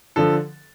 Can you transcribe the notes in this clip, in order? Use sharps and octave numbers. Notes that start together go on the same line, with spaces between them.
D3 F3 A4